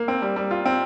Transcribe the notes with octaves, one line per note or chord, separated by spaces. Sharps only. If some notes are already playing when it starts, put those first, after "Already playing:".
Already playing: A#3
C4
G3
G3
F4
C4